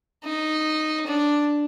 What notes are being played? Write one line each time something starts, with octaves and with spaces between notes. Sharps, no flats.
D#4
D4